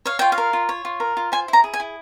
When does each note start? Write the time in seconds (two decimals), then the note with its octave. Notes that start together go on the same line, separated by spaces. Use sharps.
0.06 C#5 F5
0.19 F4 G5
0.32 F5
0.38 A#4
0.53 F4
0.69 C#5
0.85 F4
1.00 A#4
1.17 F4
1.32 C5 G#5
1.48 E4
1.53 A#5
1.64 G#4
1.74 G#5
1.80 E4